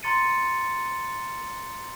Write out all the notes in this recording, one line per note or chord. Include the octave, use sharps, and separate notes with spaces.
A#5 C6 A6 C#7 D#7